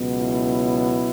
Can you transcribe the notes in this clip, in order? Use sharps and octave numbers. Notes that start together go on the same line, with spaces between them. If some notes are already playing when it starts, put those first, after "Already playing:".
Already playing: C#2 B2 F#3 B3
E4